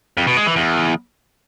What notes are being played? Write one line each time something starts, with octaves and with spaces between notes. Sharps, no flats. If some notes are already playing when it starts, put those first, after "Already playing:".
F2
B2
G#3
E3
E2